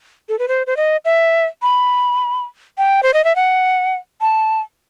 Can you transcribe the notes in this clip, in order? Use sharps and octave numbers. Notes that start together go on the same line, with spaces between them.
A4
B4
C5
C5
D#5
E5
B5
G5
C5
D#5
E5
F#5
A5